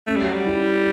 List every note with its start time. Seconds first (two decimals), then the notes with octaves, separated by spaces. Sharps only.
0.07 A3 C#4
0.16 G3
0.24 F#3
0.33 G3
0.46 E4